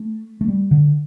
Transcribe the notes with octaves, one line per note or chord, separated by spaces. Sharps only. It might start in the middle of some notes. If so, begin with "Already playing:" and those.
Already playing: A3
A3
G3
D3